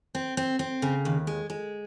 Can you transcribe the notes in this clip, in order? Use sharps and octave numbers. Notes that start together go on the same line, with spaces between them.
C4
C4
C4
C#3
D#2
G#3
G#3